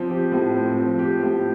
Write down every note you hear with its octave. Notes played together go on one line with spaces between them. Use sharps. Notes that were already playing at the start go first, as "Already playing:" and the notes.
Already playing: F3 C4
G4
A2
C4
F3
G4
A2